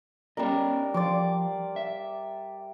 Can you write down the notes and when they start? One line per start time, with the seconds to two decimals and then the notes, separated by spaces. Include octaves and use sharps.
0.37 G3 C#4 A#4 D5 D#5
0.94 F3 D5 C6 D6
1.76 E5